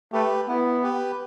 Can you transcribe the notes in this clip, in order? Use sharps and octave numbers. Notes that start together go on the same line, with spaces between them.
A3 G4 B4
B3 E4
G4 B4